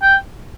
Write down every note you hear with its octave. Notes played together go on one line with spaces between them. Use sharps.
G5